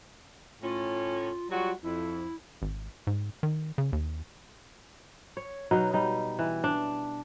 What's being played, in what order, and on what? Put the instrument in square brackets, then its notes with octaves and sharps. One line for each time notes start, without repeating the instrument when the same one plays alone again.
[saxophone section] A2 C#4 [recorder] F4
[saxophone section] F#3 G3 F#4 [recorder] F4
[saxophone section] F2 [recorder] E4
[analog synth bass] G#1
G#2
D#3
C#3
D#2
[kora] C#5
B2 F#3 D#4
G3 D#4
E3
D4